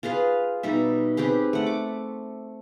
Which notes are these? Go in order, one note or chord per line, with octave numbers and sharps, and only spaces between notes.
F4 G#4 B4 F5
B2 G3 D#4 E5
C4 G4 G#4 B4
A3 F#5
D6